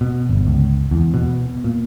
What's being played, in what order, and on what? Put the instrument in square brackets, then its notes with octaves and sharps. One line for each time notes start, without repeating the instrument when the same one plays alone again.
[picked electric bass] B2
G1
C#2
E2
B2
A#2